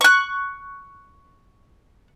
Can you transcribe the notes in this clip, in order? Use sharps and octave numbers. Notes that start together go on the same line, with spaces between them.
C#6 F#6